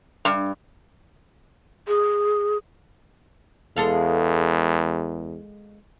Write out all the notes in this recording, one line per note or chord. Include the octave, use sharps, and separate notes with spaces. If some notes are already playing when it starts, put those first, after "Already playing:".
G2
G#4
E2 G#3 A4 F5